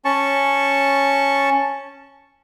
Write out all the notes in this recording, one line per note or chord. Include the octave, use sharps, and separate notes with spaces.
C#4 A5 C#6